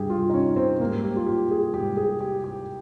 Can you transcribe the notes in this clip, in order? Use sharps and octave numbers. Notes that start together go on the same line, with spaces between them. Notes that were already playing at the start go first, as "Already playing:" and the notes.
Already playing: G2 G3 G4 G#4
F4
D#4
C#4
C4
G#2 G3 A#3
G4
F4
G4
G#4
G#2 G3 G4
G#4
G4
G4